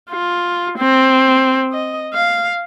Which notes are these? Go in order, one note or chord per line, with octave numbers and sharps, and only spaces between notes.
F4
C4
D#5
F5